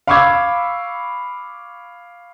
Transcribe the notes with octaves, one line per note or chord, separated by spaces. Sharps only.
F5 B5 C#6 D6 E6 G#6